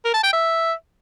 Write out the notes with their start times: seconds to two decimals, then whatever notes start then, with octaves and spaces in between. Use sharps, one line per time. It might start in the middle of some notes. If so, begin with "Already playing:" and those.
0.05 A#4
0.14 A5
0.23 G5
0.33 E5